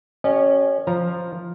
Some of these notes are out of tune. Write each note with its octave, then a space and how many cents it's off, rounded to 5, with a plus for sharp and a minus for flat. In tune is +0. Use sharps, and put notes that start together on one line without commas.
C#4 -5 G4 -25 D#5 -45
F3 +0 A#5 +0